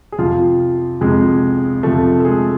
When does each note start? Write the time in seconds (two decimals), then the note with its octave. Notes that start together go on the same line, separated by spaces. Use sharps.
0.12 G#4
0.18 F2 C3 F3 F4
1.01 F2 C3 F3 G#3 G#4
1.83 F2 C3 F3 A3 A4
2.20 A4
2.25 G#3 G#4